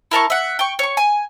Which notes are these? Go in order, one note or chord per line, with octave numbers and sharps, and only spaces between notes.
E4 A#4 A5 C#6
E5 F#5
G5 C#6
C#5 C#6
G#5